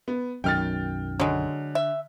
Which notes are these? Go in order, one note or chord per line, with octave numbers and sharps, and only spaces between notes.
B3
B1 F#2 D#3 G5 F6 A6
D3 F#3 G#3
E5